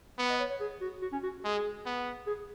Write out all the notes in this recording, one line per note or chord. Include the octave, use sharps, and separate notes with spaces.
B3 F#5
D#5
C#5
C#5
G#4
F#4
F#4
C#4
F#4
G#3 G#4
B3
G#4